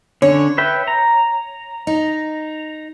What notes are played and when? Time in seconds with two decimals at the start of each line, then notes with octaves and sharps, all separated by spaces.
0.22 D3 C#4 C#5
0.58 B4 E5 G5
0.88 A#5
1.87 D#4